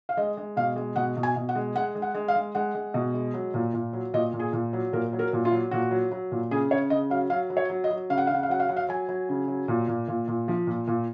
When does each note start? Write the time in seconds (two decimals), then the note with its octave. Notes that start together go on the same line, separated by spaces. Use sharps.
0.09 F5
0.17 G#3 D#5
0.37 G#3
0.56 B2 F5
0.76 G#3
0.96 B2 F#5
1.17 B2
1.23 G#5
1.36 B2
1.49 F#5
1.55 G#3
1.76 G#3 F#5
1.95 G#3
2.02 F#5
2.15 G#3
2.28 F5
2.35 G#3
2.55 G#3 F#5
2.75 G#3
2.94 B2
3.14 G#3
3.34 F#3
3.54 A#2
3.74 A#2
3.93 F#3
4.13 A#2 D#5
4.33 A#2
4.39 G#4
4.53 A#2
4.73 F#3
4.93 A#2 A#4
5.13 F#3
5.19 A#4
5.33 A#2
5.45 F4
5.52 F#3
5.71 A#2 F#4
5.91 F#3
6.12 F#3
6.31 A#2
6.51 C#3 G#4
6.71 C#3 C#5
6.90 C#3 D#5
7.10 F#3 F5
7.30 F#3 F5
7.50 F#3
7.57 C#5
7.70 F#3
7.84 D#5
7.91 F#3
8.10 C#3 F5
8.18 F#5
8.27 C#3 F5
8.35 F#5
8.43 F5
8.49 F#3 F#5
8.60 F5
8.68 F#3 F#5
8.77 F5
8.89 F#3 G#5
9.09 F#3
9.29 C#3
9.48 F#3
9.68 A#2
9.88 A#2
10.08 A#2
10.28 A#2
10.48 F3
10.67 A#2
10.87 A#2